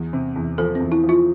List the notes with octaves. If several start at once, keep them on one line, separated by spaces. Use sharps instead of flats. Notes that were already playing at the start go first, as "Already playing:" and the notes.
Already playing: E2
C3
E2
F3 A4
C4
E2
E4
F3
F4